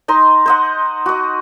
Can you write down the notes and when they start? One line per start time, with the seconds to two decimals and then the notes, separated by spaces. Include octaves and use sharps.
0.08 D#4 D#5 A#5 C6
0.46 C5 D#5 F#5
1.06 F#4 D#5